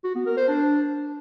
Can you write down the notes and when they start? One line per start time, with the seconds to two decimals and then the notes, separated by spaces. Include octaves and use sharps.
0.04 F#4
0.15 B3
0.26 A#4
0.37 C5
0.48 D4